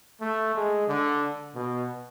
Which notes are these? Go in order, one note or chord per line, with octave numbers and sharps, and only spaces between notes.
A3
G#3
D3
B2